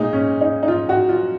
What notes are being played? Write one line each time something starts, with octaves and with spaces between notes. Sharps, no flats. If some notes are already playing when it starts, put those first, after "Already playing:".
Already playing: A#2 G#3 D#4
C#4
D#4
D#4
F4
F#4
F4